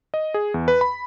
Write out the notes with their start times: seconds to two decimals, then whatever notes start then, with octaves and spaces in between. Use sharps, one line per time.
0.14 D#5
0.34 G#4
0.54 E2
0.68 B4
0.81 B5